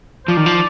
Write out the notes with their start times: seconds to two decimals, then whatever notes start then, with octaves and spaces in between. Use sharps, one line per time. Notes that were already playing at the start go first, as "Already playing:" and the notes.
0.25 C5
0.28 F3 D5
0.37 D#3
0.46 F3